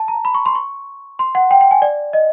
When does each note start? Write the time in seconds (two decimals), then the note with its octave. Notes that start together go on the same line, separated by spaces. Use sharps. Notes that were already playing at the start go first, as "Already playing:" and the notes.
Already playing: A5
0.08 A#5
0.25 B5
0.35 C#6
0.46 C6
0.55 C#6
1.19 C6
1.35 F#5
1.51 G5
1.61 G5
1.71 G#5
1.82 D5
2.13 D#5